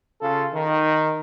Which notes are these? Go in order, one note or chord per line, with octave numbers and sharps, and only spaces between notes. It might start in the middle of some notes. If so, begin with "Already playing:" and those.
C#3 F4 A4
D#3